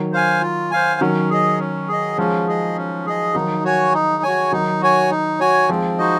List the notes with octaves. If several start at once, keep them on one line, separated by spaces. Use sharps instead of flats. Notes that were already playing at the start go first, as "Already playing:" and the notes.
Already playing: D#3 F#3
C5 F5 G#5
F4
C5 F5 G#5
D#3 F#3 C#4
G#4 D#5
C#4
G#4 D#5
F3 G#3 C#4
G#4 D#5
C#4
G#4 D#5
D#3 F#3 D#4
F#4 C#5 G#5
D#4
F#4 C#5 G#5
D#3 F#3 D#4
F#4 C#5 G#5
D#4
F#4 C#5 G#5
F3 G#3 C4
D#4 F#4 C5 D#5